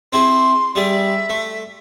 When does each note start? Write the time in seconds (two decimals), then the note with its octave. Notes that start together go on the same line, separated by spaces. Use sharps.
0.13 C4 E4 G#4 C6
0.75 G3 G#4 D5 E5
1.29 A3